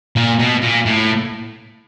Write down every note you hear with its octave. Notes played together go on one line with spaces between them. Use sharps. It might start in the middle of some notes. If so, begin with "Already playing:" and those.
A#2
B2
A#2
A2